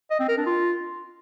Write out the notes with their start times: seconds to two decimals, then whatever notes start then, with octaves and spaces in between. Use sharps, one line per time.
0.11 D#5
0.20 C4
0.28 A#4
0.37 D4
0.46 F4